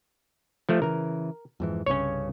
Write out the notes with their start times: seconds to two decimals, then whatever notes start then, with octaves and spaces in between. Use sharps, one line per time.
0.69 F3 A3
0.82 C#3 E3 A#4
1.60 F2 G#2 E3
1.86 C2 G2 C#3 C#4 C#5